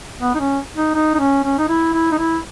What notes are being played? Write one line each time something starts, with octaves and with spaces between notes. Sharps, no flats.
B3
D#4
C#4
D#4
D#4
D#4
C#4
C#4
D#4
E4
E4
D#4
E4